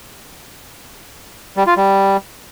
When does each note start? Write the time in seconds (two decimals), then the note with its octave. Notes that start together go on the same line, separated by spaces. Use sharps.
1.57 G3
1.67 F4
1.77 G3